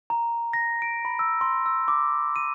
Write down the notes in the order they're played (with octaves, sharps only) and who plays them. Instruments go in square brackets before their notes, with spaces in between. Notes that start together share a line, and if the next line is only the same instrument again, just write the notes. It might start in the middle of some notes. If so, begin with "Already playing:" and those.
[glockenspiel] A#5
A#6
D7
B5
E6
C6
E6
D6
D#7